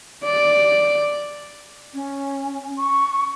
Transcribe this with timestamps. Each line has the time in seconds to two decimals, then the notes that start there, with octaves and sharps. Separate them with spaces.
0.24 D5
1.94 C#4
2.76 C#6